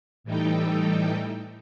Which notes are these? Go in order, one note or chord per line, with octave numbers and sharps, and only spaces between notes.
A2 E3 G3 D#4 A4 G5